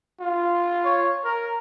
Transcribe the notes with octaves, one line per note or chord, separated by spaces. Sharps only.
F4
C#5
A#4